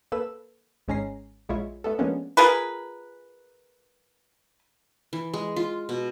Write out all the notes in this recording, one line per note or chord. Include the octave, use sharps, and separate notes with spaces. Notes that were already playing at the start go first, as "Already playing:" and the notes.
A#3 A4 B4 E6
G#1 G#3 C#4 A#5 C7
A#1 G#3 E4 F4 C#5
A3 B3 A4
F3 G#3 A#3 B3 C#4 D4
F4 G#4 A#4 B4
E3
G#3
F4
B2